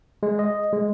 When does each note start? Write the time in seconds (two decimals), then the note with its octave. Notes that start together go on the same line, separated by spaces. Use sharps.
0.23 G#3
0.39 D#5
0.73 G#3